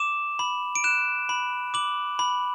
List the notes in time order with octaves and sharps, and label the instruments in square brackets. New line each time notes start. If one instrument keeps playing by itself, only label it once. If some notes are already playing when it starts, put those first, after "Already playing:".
Already playing: [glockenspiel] D6 E7
B5
D7
F#6 E7
B5
D6 F#7
B5